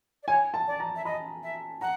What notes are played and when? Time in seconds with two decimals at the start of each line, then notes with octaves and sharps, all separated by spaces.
0.23 D5
0.28 C#5 G#5
0.54 A5
0.67 D5
0.80 A#5
0.96 E5
1.05 D#5 B5
1.43 E5
1.81 F#5 A#5